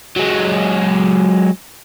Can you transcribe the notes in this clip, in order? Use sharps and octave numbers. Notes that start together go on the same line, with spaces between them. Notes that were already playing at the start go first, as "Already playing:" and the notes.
F#3 G#3